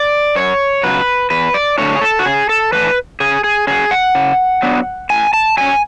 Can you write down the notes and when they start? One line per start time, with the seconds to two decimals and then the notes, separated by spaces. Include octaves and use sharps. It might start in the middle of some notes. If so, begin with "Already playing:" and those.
Already playing: D5
0.35 F#2 C#5
0.83 C#3 F#3 B4
1.30 E2 B4
1.54 D5
1.78 D3 F#3 A3 D4 C#5
1.96 G#4
2.01 A4
2.19 F#4
2.25 C#3 G#4
2.49 A4
2.72 E3 A3 D4 B4
3.20 C#3 G#4
3.44 G#4
3.67 F#3 C#4 G#4
3.91 F#5
4.15 C#3
4.62 F#3 B3 D4
5.10 A2 G#5
5.33 A5
5.57 F#3 C#4 G#5